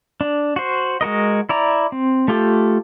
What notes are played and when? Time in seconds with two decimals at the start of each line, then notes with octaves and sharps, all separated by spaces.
0.21 D4
0.56 F#4 C5
1.01 G#3 F#4 A#4 D#5
1.49 E4 D5 A#5
1.92 C4
2.28 A3 F4 G4 A4